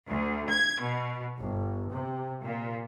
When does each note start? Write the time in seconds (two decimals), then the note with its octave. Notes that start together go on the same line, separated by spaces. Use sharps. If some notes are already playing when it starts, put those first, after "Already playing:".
0.10 D2
0.50 G#6
0.82 B2
1.40 G1
1.93 C3
2.43 A#2